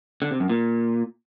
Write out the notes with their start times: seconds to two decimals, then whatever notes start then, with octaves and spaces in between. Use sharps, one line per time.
0.22 D3
0.31 C3
0.40 F#2
0.49 A#2